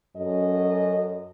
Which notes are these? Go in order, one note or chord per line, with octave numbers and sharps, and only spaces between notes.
F#2 F#3 C#4 A4 D#5